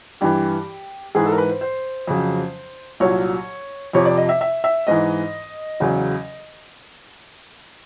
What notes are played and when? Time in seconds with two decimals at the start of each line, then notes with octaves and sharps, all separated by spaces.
0.21 G2 E3 G4
1.15 G#2 E3 G#4
1.26 A4
1.32 A#4
1.38 B4
1.49 C5
1.61 C5
2.07 F2 C#3 F#3
3.00 C2 A#2 F#3 C#5
3.93 F2 C3 F3 C#5
4.05 D5
4.17 D#5
4.29 E5
4.41 E5
4.64 E5
4.87 G#2 E3 D#5
5.80 E2 C#3 F#3